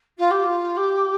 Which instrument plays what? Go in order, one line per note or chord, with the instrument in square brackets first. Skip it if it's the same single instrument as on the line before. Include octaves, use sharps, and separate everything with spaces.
[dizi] F4
G4
F4
G4